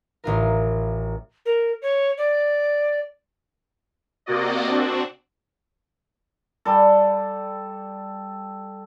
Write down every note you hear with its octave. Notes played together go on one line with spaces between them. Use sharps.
A1 F4 A#4
A#4
C#5
D5
C3 A#3 F#4 D5 D#5
C4 D4 F#4
G3 A4